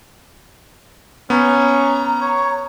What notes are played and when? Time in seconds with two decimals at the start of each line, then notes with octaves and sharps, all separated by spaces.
1.30 B3 C#4 A#5
2.21 C#5